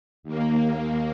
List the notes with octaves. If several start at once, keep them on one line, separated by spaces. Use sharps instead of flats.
D#2 A#3